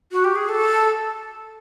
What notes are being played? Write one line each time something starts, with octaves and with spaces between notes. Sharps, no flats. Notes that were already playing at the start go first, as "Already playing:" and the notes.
F#4
G4
G#4
A4